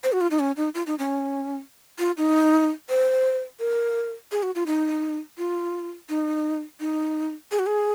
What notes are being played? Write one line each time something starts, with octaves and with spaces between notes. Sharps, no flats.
C5
F#4
F4
D#4
C#4
D#4
F4
D#4
C#4
F4
D#4
C5
A#4
G#4
F#4
F4
D#4
F4
D#4
D#4
G#4
F#4
G#4